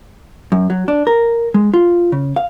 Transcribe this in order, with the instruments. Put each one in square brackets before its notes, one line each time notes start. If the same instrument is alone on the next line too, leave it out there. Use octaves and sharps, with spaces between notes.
[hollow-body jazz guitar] F#2
F#3
D4
A#4
G#3
F4
C#3
F5